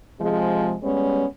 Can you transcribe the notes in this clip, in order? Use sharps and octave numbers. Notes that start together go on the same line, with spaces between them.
C3 F3 G#3
G3 G#3 B3 C#4